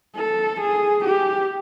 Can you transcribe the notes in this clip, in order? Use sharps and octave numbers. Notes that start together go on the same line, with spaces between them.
A4
G#4
G4